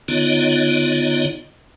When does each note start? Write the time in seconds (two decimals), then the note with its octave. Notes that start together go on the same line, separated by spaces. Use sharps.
0.08 D3 B3 D#4 F4 C#5 D#5